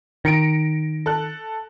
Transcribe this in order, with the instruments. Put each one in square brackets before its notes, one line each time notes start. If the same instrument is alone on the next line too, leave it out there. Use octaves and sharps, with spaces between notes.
[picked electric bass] D#3 [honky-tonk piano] A#6 C#7 D7
[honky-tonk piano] A4 F#6